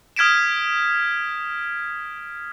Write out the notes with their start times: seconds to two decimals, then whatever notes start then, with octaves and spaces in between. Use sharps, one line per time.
0.16 D#6 F6 G#6 B6 D7 E7